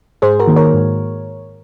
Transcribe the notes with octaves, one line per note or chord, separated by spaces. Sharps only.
G#2 G#4 C5
F#4 A#4
D#3 A#3
A#4 C#5
G#2